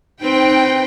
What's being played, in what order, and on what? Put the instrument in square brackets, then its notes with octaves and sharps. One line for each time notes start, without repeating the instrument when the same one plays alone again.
[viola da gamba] C4 B4 [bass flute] D#4 [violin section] G5